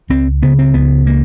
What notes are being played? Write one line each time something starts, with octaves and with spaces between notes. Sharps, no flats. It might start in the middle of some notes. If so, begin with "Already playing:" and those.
C#2 C4
C#3 B3
C4
C#2 B3
C#3 A#3